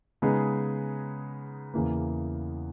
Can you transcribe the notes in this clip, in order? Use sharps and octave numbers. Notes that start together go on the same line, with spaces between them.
C#3 G#3 B3 D#4 G#4
E2 C#3 E3 A#3